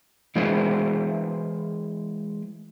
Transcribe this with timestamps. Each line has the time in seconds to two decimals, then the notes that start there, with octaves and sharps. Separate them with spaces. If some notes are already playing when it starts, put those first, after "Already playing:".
0.36 E3 G#3 E4 G#4 A#4 C5